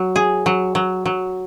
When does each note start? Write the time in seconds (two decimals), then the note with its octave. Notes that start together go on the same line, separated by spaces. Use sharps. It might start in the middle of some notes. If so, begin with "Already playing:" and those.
Already playing: F#3
0.16 G#4
0.46 F#3
0.75 F#3
1.06 F#3